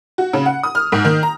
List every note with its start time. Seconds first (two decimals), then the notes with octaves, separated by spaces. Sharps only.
0.18 F#4
0.33 C#3
0.46 F#5
0.63 D#6
0.75 F6
0.92 G#2
1.05 D#3
1.23 A#5